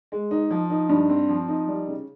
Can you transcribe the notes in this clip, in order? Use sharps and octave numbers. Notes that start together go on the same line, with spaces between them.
G#3
D#4
F3
D#4
G2
C4
F3
D#4
G3
C#3